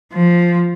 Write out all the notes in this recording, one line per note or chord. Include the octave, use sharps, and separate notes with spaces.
F3